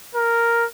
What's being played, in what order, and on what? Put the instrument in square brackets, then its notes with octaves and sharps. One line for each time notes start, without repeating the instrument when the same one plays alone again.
[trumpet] A#4